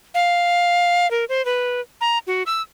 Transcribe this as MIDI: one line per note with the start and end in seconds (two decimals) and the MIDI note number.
0.14 1.09 77
1.11 1.25 70
1.29 1.44 72
1.45 1.81 71
2.01 2.18 82
2.27 2.43 66
2.46 2.62 88